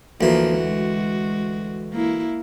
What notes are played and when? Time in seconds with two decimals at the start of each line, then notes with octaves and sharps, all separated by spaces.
0.21 D2 E3 F3 A#3
0.58 G#3 F#4
1.93 A#3 E4